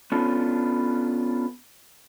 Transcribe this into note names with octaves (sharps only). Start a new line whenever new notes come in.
B3 C#4 D4 F4 A4